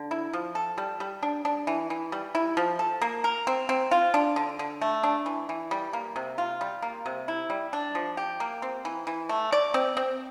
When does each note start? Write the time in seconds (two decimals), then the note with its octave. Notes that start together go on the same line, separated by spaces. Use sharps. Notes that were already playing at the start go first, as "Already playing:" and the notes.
Already playing: D3
0.11 E4
0.33 F3
0.55 A4
0.78 G3
1.00 G3
1.23 D4
1.45 D4
1.67 E3
1.90 E3
2.12 G3
2.35 E4
2.57 F3
2.79 A4
3.02 A#3
3.24 A#4
3.47 C4
3.69 C4
3.91 F4
4.14 D4
4.36 D3
4.59 D3
4.81 A3
5.03 D4
5.26 E3
5.49 E3
5.71 G3
5.93 A#3
6.16 C3
6.38 F4
6.61 G3
6.82 A#3
7.06 C3
7.28 E4
7.50 G3
7.73 D4
7.95 F3
8.17 G4
8.40 A#3
8.62 C4
8.85 E3
9.07 E3
9.29 A3
9.52 D5
9.74 C4
9.97 C4